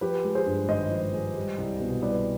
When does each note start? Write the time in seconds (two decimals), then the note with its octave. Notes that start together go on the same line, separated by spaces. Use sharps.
0.01 F3 G4 B4
0.24 G#3
0.35 G#4 C5
0.46 G2
0.69 G#1 C5 D#5
0.91 F3
1.13 G#3
1.36 G3
1.58 C2
1.80 B2
2.02 C2 B4 D5